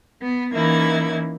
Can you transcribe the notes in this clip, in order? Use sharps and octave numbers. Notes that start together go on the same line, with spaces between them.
B3
E3 A#3 C#4 D#4 E4 G#6